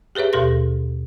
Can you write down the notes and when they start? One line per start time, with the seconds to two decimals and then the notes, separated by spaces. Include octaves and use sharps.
0.15 G4 G#4 B4 C#5 E5
0.33 D#2 B2 G4 A4 C6 A#6